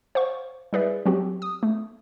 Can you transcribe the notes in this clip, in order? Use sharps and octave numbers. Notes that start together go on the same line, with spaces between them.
C5 F5 F#5 C#6
G3 E4 G#4 B4 D5 E5
F#3 C4 F#4 G4
D#6
A3